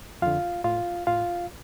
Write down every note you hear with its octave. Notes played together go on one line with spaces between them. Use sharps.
F2 D3 F4 F5
A2 F4 F5
A2 F4 F5